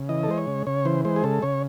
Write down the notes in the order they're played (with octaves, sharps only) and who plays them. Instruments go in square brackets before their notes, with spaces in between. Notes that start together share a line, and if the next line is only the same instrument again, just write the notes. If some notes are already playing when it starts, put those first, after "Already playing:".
Already playing: [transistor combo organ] C#3
E3 D#5
A4
G#3 C5
C#5
C#3
C#3 C#5
E3 C5
G#3 C5
G#4
C#3 A4
C#3 C#5